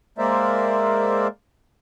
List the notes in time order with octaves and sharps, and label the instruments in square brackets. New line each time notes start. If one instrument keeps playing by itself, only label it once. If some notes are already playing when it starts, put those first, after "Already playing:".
[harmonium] G#3 A#3 A#4 C5 D5 E5